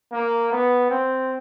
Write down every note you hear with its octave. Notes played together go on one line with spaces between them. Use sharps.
A#3
B3
C4